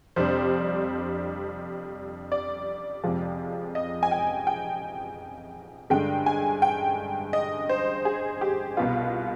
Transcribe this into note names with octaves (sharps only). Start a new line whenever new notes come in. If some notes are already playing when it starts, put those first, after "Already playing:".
F2 C3 G3 D4 C5
D5
F2 C3 F3 G#3
D#5
G#5
G5
G5
G2 D3 G#3 G5
G#5
G5
D#5
C5
G#4
G4
C2 B2 B3 F4